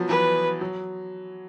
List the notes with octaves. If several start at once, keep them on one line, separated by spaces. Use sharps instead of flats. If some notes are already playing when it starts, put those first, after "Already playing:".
Already playing: F3 F#3 B3
E3 B4
F#3